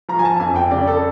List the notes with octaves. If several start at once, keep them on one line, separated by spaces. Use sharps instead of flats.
F3 A#5
G#5
A5
F2 G#5
G5
C#3 D5
A4